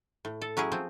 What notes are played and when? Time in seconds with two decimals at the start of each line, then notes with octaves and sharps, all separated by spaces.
0.25 A2
0.41 A4
0.57 F#3 C#4 E4 G#4
0.72 F3 C4